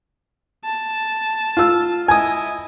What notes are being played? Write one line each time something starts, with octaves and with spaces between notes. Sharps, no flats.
A5
F4 E6
E4 D#5 G#5 D#6